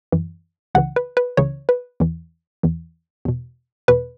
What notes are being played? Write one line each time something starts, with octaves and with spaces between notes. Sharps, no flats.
F#2 E3
C#2 C#3 E3 F#5
B4
B4
C#2 C#3 E3 C#5
B4
E2 E3
E2 E3
E2 B2
E2 B2 B4